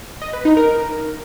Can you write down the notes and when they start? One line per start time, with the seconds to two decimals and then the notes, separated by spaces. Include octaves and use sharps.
0.22 D#5
0.33 B4
0.45 D#4
0.57 A#4